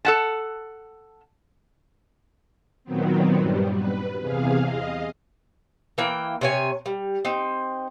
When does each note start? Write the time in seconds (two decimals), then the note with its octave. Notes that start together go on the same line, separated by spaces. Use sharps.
0.05 A4 F#5 A5
2.84 A#2 D#3 F#3 B3 C4
3.36 G2 G3
3.74 B4
4.20 E2 C3 G#4 F5
4.63 D#5 F5
5.98 E3 A#3 G5
6.41 C3 C#5 G#5
6.86 G3
7.25 C4 D#4